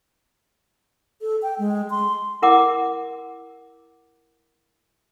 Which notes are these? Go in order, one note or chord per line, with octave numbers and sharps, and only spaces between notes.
A4
G5
G#3
C6
E4 A#4 F#5 D6